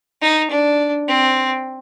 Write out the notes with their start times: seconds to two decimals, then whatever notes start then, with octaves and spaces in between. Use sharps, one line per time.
0.22 D#4
0.50 D4
1.08 C4